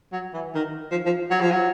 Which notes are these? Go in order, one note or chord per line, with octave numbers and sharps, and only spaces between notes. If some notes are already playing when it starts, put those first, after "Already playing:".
F#3
E3
D#3
F3
F3
F#3
F3
F#3